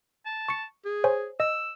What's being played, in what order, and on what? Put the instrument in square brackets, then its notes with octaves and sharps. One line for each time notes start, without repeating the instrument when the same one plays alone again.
[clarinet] A5
[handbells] C#6 C#7
[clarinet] G#4
[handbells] C5 C#5 G#5
[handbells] D#5 [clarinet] E6